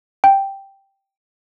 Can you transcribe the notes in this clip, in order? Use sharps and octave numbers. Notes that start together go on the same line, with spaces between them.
G5